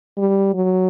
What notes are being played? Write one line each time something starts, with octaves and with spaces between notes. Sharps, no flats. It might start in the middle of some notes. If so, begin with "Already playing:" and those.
G3
F#3